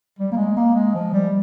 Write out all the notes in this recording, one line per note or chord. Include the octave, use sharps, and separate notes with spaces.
G3
A#3
G#3
A#3
G#3
F3
G3